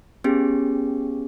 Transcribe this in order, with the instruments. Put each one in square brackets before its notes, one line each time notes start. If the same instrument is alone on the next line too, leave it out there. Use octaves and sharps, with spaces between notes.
[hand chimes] B3 C#4 G4 G#4